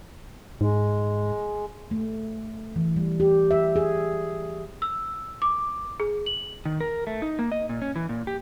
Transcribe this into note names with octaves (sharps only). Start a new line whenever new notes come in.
G#2 G#3
A3
E3
G3
G4
E5
G#4
E6
D6
G#4
F#7
D#3
A#4
A3
D#4
A#3
D#5
A#2
C#4
E3
A#2
G4